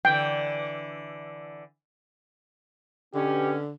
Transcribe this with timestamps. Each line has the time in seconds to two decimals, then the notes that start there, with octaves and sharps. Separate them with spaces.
0.05 D3 E3 G5
3.14 B2 D3 C#4 G4